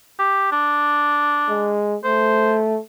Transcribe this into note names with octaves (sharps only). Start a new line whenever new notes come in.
G4
D4
G#3
A3 C5